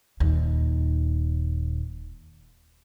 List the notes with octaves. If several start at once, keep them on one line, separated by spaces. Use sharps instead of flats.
D#1 D#2